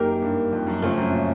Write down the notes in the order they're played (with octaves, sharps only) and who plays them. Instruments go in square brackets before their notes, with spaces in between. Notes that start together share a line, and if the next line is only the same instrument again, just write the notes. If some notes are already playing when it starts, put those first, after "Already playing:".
Already playing: [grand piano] F#2 [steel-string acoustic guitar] A#3 D#4 G4 A#4
[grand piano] G2
F2
F#2
[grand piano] F2 [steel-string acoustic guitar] C#3 F3 A3 C#4
[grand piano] F#2
A#2